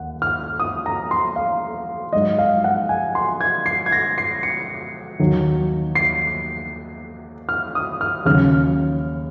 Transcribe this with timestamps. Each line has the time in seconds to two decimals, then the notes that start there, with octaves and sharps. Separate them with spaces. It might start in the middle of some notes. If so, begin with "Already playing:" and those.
Already playing: D#2 F#5
0.22 F6
0.60 D#6
0.86 A#5
1.11 C6
1.36 F5
2.13 G#2 F#3 D#5
2.39 F5
2.64 F#5
2.89 G#5
3.15 C6
3.41 G#6
3.66 C7
3.86 G#6
3.92 A#6
4.18 C7
4.43 C#7
5.19 D#2 D#3 F#3
5.95 C7
7.49 F6
7.75 D#6
8.01 F6
8.25 D#2 C#3 F#3 F6